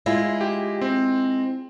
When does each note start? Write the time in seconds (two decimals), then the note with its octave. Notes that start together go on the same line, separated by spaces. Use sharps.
0.06 G#3 E4 F4
0.41 G4
0.81 C4